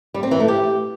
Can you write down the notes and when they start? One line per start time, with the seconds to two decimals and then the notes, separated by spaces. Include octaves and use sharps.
0.14 G3
0.23 C4
0.31 E3
0.40 A3
0.48 G4